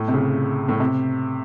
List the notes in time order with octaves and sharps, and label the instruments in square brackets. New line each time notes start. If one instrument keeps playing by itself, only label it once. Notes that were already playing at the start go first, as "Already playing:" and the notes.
Already playing: [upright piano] A2
C3
C#3
A2
C3